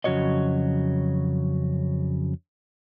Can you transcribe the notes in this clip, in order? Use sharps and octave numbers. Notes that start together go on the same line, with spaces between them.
F2 C#3 F#3 F#4 C#5 D#5